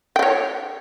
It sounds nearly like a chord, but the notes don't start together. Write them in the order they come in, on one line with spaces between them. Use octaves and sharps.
G5 D5 C#5